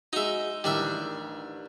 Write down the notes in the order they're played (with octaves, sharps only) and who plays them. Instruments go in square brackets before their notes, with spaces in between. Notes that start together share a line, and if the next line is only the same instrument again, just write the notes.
[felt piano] G#3 F#4 [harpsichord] D#4 E5
[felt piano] A1 D#3 D#5 [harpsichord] G3 D4 E5